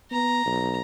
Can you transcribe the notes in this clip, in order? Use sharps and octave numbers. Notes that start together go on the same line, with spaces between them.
B3 A#5
B1